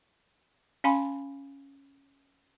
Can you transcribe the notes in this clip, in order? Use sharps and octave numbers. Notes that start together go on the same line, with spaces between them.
C#4 F5 G#5 B5 C6